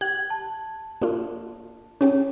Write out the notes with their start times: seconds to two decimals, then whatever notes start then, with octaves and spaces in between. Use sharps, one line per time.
0.01 G4 F#6 G#6
0.30 A5
1.02 A#3 D4 F4
2.01 C#4 G4 G#4 C#5